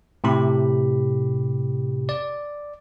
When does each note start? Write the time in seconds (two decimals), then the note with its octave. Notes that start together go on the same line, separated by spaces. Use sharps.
0.24 A2 C3 G4 B5
2.09 D5